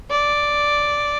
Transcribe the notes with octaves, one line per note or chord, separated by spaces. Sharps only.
D5